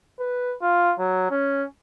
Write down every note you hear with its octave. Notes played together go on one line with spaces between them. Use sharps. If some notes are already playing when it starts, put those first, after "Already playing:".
B4
F4
F#3
C#4